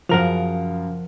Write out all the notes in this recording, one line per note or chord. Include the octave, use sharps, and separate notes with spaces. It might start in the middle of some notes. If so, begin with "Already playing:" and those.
F#2 C#3 F3 A#4 F#5 F7